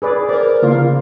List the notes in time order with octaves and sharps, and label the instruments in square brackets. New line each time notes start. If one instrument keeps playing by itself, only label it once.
[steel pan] G#4 B4 D5
[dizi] A#4 [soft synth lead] C5 [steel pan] D5
[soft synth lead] C#3 [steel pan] A#3 F4